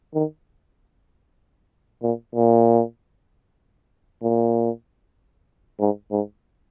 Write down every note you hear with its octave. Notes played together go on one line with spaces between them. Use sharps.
D#3
A#2
A#2
A#2
G#2
G#2